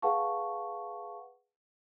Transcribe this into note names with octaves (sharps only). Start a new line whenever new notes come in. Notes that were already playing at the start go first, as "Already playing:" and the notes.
G#4 B4 F5 F#5 A5 C#6